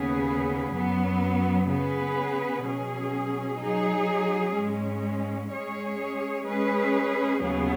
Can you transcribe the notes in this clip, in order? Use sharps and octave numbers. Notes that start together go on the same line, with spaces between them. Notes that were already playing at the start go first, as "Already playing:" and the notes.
Already playing: D#2 C#3 B3 G#4 B4
F#2 F#3 B3
C#3 B3 G#4 B4
B2 F#3 C#4 G#4
F#3 D#4 G#4
G#2 G#3 C#4
G#3 C#4 G#4 C#5
G#3 C#4 G#4 B4
D#2 C#3 F#3 B3 G#4